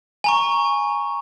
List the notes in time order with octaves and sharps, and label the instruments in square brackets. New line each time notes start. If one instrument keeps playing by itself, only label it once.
[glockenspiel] G#5 A#5 C#6